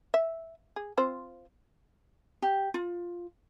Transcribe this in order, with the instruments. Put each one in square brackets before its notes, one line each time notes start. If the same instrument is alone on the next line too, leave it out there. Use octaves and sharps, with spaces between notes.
[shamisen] E5
G#4
C4 F4 C5
[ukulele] G4
F4